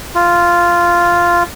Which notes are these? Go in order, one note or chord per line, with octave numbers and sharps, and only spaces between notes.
F4